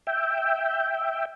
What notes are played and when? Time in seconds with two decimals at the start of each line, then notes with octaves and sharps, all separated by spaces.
0.07 E5 G5